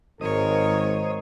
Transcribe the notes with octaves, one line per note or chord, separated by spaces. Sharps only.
G#1 G#2 A#4 C5 C#5 D#5 D#6